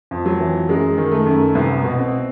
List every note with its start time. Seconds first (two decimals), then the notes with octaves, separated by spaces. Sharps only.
0.11 F2
0.25 F#3
0.40 E3
0.69 F#2 G#3
0.98 D#3
1.11 A3
1.26 F#2
1.55 C2 B3
1.84 B2
1.99 C4